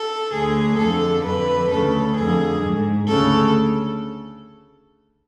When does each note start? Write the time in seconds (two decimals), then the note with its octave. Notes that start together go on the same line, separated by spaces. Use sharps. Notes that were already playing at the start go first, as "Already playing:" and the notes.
Already playing: A4
0.33 D2 D3 G#4
0.78 F2 D3 A4
1.25 F2 D3 B4
1.70 D2 C#3 A4
2.16 F2 D3 G#4
2.62 G#2
3.08 D2 C#3 A4